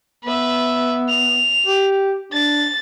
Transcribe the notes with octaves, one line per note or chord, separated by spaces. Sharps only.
B3 B4 E5
F7
G4
D4 A6